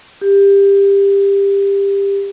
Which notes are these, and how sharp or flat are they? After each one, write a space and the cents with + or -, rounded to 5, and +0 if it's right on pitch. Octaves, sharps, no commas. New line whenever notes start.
G4 +20